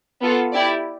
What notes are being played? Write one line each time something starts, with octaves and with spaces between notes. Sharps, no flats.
B3 F4 A4
E4 G4 D5